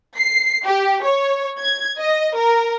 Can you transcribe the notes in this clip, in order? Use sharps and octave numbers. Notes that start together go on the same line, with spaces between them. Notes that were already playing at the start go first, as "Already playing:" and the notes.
C7
G4
C#5
G#6
D#5
A#4